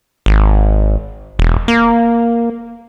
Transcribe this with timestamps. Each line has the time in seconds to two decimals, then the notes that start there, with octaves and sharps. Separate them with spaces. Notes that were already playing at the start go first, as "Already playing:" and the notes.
0.26 G#1
1.39 E1
1.68 A#3